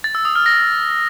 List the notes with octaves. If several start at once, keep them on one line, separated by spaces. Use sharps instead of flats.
A6
E6
D#6
F6
A#6